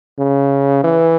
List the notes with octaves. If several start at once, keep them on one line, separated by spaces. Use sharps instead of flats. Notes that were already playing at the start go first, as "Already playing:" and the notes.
C#3
E3